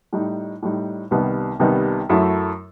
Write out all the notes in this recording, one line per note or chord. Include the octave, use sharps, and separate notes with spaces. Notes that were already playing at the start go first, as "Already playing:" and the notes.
A2 G3 D#4
A2 G3 D#4
C2 C3 D#3 G3 B3
C2 C3 D#3 G3 B3
F#2 F#3 A3 E4